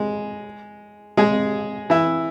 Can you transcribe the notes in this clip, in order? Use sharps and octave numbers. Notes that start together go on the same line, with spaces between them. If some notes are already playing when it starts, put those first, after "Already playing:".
Already playing: G#3
G#3 G#4
E3 E4